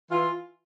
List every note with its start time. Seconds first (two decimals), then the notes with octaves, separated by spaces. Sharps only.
0.10 E3 F4